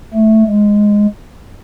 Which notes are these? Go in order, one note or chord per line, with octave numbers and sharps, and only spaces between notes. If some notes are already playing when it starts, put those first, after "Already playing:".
A3
G#3